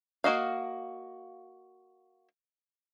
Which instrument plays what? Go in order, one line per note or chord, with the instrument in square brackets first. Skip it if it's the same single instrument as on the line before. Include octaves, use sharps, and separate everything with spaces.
[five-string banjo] A#3 F#4 D#5 F5